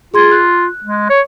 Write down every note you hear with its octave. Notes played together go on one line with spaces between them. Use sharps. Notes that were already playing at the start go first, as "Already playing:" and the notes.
F4 G#4 C6 G#6
F#6
G#3
C#5